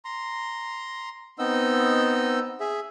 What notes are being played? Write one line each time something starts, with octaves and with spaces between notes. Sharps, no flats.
A#5 C6
B3 C4 D#4 D#5 E6
G#4 E5